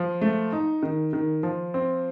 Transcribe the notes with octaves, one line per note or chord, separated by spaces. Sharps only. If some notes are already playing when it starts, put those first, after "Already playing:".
Already playing: F3
A3
D#4
D#3
D#3
F3
C4